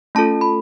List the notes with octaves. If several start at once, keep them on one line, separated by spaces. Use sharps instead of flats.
A3 C#4 F4 A4 A5
B5